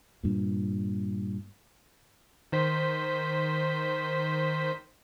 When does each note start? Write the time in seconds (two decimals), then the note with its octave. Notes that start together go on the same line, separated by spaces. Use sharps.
0.23 G2 A#2
2.52 D#3 C5 B6